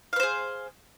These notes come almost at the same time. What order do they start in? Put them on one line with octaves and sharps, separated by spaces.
F5 B4 C5 G#4